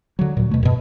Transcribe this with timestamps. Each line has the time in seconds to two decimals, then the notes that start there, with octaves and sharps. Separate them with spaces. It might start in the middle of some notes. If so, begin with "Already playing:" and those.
0.19 D3 F#3
0.37 D2 A#2
0.51 B2 A3
0.63 F#2 B2